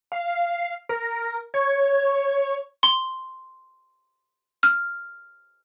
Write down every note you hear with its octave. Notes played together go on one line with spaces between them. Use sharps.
F5
A#4
C#5
C6
F6